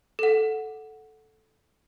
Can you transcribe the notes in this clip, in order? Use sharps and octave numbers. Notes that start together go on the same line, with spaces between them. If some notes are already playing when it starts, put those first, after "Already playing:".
A4 F#5